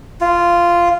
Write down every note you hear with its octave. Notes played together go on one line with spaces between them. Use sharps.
F4